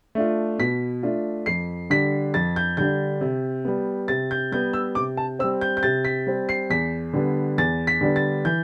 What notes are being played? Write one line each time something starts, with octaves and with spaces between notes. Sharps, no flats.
A3 D4 F4
B2 B6
A3 D4 F4
F2 C7
D3 G3 D4 B6
F2 A6
G6
D3 G3 D4 G6
C3
G3 B3
C3 A6
G6
G3 B3 G6
E6
C3 D6
A5
G3 C4 E6
G6
G6
C3 A6
B6
G3 C4
C7
E2 B6
D3 G3 B3 D4
E2 A6
B6
D3 G3 B3 D4
A6
E3 G6